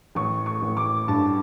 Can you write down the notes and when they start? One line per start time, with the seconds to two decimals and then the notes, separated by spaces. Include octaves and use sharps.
0.15 A1 C#6
0.46 C#6
0.62 A1
0.77 D6
1.08 G2 A5